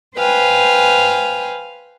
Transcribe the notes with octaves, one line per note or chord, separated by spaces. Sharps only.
B4 C5 F5 G5 G#5